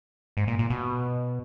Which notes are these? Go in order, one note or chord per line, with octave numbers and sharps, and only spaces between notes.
G#2
A#2
A#2
B2